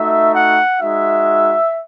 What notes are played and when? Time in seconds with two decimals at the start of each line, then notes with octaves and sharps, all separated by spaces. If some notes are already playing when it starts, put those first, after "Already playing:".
Already playing: A3 D#4 F#4 E5
0.33 F#5
0.81 G#3 D#4 F#4 E5